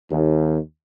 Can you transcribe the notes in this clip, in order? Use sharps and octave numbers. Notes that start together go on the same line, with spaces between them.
D#2